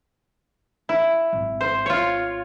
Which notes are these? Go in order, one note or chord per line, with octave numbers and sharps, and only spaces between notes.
E4
G#1
C5
F4 C#5